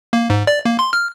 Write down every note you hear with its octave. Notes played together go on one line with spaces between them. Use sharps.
A#3
G#2
D5
A#3
C6
F6